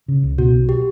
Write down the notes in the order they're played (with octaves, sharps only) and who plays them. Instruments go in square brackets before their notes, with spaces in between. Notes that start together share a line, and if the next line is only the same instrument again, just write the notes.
[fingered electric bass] C#3
C#2
[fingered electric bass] B2 [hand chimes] F#4
[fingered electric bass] B1
[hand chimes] G4